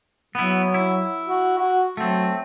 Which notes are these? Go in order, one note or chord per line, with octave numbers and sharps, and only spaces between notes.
F#3 B3 E4
E4
F#4
F#4
F#3 A3 C4